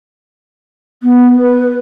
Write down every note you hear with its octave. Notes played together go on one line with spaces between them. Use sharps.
B3
B4